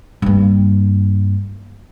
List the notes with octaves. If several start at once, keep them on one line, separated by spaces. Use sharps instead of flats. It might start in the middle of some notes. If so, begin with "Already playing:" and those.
G2 A#3